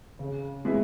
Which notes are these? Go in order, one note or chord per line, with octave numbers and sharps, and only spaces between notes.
C#3
G#3 B3 E4